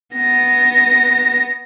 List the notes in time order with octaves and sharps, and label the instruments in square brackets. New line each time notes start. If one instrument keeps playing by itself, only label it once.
[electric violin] B3 A#6